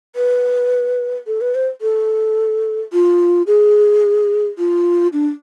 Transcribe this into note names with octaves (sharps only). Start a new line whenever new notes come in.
B4
A4
B4
C5
A4
F4
G#4
F4
D4